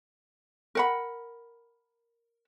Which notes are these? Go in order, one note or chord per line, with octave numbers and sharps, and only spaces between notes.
A#4 F#5 B5